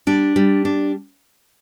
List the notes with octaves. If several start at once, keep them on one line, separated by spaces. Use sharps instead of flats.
G3 D4 D5
G3
D4